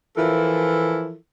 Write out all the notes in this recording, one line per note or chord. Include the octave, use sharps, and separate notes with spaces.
E3 F3 E4 F4 A4 A#4